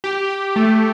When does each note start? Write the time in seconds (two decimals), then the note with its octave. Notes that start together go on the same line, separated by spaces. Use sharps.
0.04 G4
0.30 G4
0.56 A3